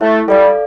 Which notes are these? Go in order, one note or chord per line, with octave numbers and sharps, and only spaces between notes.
A3 E4
G3 A4 D5 F5